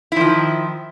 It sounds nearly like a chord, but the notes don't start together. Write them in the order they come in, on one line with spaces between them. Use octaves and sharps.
E4 F3 D#3